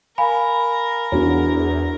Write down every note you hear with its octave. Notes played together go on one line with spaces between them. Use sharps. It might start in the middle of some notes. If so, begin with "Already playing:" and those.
A#4 F5 G#5 B5
E2 D4 F#4 C#5